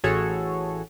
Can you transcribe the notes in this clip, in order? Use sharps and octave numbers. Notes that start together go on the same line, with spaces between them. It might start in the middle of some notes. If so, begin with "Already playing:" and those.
A1 A2 F#4 G#4 A4 C#5